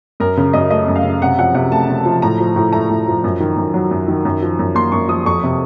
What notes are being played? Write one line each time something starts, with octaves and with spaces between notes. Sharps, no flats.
F#2 A#4
C#3 A#4
F#2 D#5
A3 D#5
F#2
F5
C#3
C3 F#5
F3 F#5
C3 F#5
A3 A5
C3
F3
A2 A#5
F3
A2
A3 A#5
A2
F3
F#2
D#3
F#2
F#3
F#2
D#3
F#2
F3
F#2
A#3 C6
F#2 C#6
F3 D#6
F2 C#6
C3